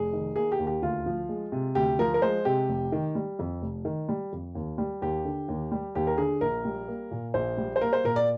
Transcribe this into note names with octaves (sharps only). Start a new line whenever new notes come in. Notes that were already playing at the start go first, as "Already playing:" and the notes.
Already playing: F1 G#4
D#3
A#3 G#4
G4
D#2
G4
D2 F4
F3
G#3
C3
D2 G4
F3 A#4
A#4
G#3 C5
C3 G4
F1
D#3
G3
F2
F1
D#3
G3
F2
D#2
G3
D#2 G4
D3
D#2
G3
D#2 G4
A#4
D3 G#4
A#1 A#4
G3
A#3
A#2
A#1 C5
G3
C5
A#3 A#4
C5
A#2 A#4
D5